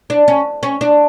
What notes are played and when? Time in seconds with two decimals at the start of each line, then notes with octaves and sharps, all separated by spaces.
0.10 D4
0.28 C#4
0.63 C#4
0.81 D4